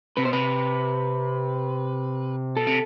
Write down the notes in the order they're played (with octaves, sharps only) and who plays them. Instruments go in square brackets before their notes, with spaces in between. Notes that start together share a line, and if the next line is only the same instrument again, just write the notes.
[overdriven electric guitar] C3 [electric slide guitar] B4
[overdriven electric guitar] B2 [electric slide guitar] C5
[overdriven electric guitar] C3 [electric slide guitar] B4
[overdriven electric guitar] B2 [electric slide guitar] A4
[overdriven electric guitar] C3